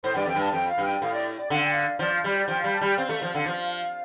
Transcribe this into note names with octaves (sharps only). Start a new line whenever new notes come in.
A2 C5
G2 D5
F2 G5
G2
A5
F2 G5
F5
G2
G5
A2 F5
D5
D5
D3 F5
G5
F5
F3 D5
F5
G3 D5
D5
F3 G5
G3 F5
A5
G3 G5
C4 F5
A3
F3
D3
F3